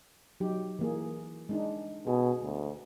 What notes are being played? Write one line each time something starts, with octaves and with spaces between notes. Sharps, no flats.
F#3 D#4 G4
E3 A#3 G#4
G#3 D4 D#4
B2 G#4
D2